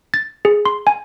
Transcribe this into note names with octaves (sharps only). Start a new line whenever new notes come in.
A6
G#4
C6
G#5